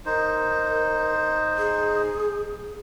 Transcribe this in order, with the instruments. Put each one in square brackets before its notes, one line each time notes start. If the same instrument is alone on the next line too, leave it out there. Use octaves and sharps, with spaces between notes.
[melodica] D#4 C5 [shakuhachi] A#4
[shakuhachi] G#4